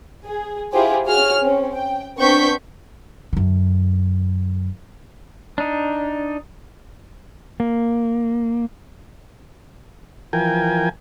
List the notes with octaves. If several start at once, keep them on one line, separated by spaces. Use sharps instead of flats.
G#4
E4 F4 G4 G#4 C5
F#4 G#4 C#5 F6
C4 C#4
G5
B3 C4 D4 C#6 G6 B6
F#2 D3
D4 D#4
A#3
E3 F3 A#4 G5 G#5